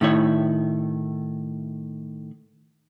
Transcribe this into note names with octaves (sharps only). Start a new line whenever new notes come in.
A2 D#3 E4 C#5